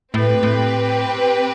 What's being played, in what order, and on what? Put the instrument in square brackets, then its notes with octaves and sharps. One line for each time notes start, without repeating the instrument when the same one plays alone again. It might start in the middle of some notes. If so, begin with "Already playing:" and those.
[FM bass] A2 [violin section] C4 G4 B4
[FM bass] A2